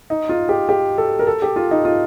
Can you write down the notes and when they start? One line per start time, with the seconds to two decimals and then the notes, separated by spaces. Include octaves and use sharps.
0.10 D#4
0.29 F4
0.49 G4
0.69 G4
0.98 A4
1.19 A#4
1.27 A4
1.42 G4
1.56 F4
1.71 D#4
1.85 F4